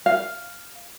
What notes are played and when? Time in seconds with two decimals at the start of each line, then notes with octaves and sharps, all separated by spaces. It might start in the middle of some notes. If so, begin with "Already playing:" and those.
0.06 F5